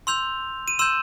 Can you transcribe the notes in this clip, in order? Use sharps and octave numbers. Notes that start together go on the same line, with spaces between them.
C6 E6 G6 F7
D#7
C6 E6 G6 E7